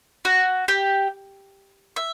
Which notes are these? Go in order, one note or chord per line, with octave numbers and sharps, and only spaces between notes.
F#4
G4
E5